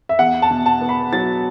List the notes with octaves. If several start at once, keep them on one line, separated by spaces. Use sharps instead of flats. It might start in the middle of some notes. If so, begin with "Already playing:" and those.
E5
E2 F#5
A5
B2
A5
B3
B5
F#3 A6